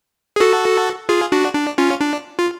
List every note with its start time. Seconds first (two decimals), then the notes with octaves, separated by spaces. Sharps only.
0.36 G#4
0.40 F#4 A4
1.09 F4 G#4
1.32 D4 F#4
1.54 D4
1.78 C#4 F4
2.01 D4
2.39 F4